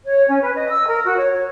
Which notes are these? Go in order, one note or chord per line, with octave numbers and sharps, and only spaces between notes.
C#5
C#4
B4
D#5
E6
A#4
F#4
C#5
C#5